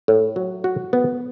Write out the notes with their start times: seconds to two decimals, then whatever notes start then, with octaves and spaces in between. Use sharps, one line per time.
0.08 A2
0.36 F#3
0.64 F#4
0.93 B3